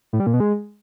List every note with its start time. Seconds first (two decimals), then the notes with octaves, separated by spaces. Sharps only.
0.13 A2
0.20 G3
0.27 A#2
0.33 B2
0.40 G#3